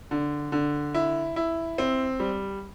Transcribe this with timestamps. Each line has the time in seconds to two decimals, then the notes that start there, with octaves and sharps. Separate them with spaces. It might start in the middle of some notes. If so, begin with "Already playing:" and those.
0.11 D3
0.52 D3
0.94 E4
1.36 E4
1.78 C4
2.20 G3